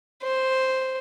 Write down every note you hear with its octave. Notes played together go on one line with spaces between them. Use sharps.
C5